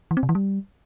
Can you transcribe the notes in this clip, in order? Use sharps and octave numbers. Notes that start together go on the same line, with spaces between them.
E3
C4
C3
E3
G3